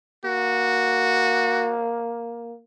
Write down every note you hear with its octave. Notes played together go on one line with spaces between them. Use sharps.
A#3 F#4